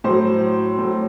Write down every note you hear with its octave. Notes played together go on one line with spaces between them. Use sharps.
A2 F#3 C5
A2 F#3